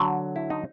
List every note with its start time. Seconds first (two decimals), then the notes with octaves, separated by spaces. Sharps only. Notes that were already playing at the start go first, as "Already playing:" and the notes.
Already playing: D3 F#3
0.36 E4
0.50 D#4